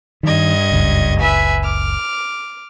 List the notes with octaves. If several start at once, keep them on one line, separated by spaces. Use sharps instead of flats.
G2 D#3 D#5 G#6
F#1 C#2
B4 E5 G#5
D6 F6